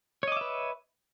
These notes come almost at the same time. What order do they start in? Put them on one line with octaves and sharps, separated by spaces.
C#5 D#5 D6 E5 B4